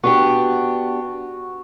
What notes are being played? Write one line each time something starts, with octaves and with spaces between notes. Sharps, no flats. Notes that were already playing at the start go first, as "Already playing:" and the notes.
B3 D4 F#4 G4